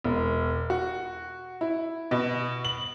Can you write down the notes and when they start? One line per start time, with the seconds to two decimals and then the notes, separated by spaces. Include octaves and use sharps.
0.04 E1
0.70 F#4
1.61 E4
2.11 B2
2.65 F#7